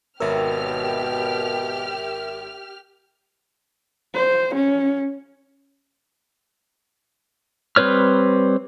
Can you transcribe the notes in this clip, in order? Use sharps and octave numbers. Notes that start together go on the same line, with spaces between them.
G#1 B2 G4 A#4 C#5 E5 E6 F6
C5
C#4
G3 C4 B4 C#5 F6